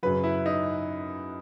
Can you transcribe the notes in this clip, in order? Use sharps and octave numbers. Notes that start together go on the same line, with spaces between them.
F#2 C#3 F#3 B4
E4
D#4